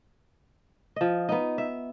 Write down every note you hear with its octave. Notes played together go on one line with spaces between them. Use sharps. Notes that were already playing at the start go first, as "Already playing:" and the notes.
F3 D#5
B3 D#4
E5